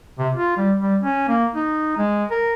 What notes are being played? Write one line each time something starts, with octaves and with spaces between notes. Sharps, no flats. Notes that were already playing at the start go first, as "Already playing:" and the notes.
C3
F4
G3
G3
C#4
A#3
D#4
G#3
A#4